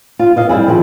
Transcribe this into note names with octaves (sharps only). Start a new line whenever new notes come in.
F4
E4 D#5 F5
G3 C4 E4 G#4
D#3 F3